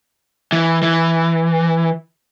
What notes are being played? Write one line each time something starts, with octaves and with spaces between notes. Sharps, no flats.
E3
E3